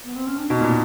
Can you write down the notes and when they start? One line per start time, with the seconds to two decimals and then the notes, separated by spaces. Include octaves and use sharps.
0.05 B3
0.16 C4
0.27 C#4
0.38 D4
0.49 B2 D#4
0.61 A#2